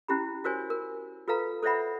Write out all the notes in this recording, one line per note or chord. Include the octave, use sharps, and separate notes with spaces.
C#4 E4 G4 B5
F#4 A#4 C5 C#5 G#5
A#4
F4 A4 B4 F5 A#5
A4 C5 C#5 E5 F#5 B5